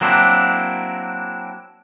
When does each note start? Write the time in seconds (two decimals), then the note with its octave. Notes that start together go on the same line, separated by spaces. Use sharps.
0.01 F#3 A#3 C4 D4 E4